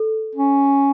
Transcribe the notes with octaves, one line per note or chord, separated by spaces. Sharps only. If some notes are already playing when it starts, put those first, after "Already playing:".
Already playing: A4
C#4